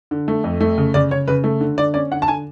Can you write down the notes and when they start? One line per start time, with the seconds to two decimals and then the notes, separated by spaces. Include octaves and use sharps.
0.11 D3
0.28 A3
0.44 F2
0.61 A3
0.78 C#3
0.94 C#3 D5
1.11 C#3 C#5
1.28 C#3 B4
1.44 A3
1.60 D3
1.77 D3 D5
1.94 C#4 D5
2.12 D3 F#5
2.22 A5
2.28 D3 G#5